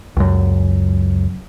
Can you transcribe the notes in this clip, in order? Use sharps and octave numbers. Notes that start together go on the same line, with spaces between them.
C#2 F#2